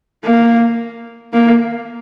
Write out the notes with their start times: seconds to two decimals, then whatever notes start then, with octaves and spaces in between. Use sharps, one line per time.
0.24 A#3
1.33 A#3